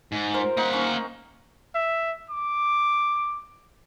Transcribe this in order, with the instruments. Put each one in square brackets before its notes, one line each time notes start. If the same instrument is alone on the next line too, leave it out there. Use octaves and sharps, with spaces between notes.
[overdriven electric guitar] G#2
[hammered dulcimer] A#4 C5
[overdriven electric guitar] A#3 F#5 [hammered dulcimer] D#4
[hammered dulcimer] C#4
[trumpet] E5
D6